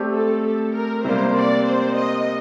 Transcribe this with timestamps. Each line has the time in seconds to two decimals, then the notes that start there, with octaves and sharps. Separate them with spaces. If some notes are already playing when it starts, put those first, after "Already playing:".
Already playing: A3 C4 G4 D5
0.13 A4
0.44 A4
0.74 A#4
1.05 C3 G3 A#3 C5
1.35 D5
1.65 C5
1.96 D#5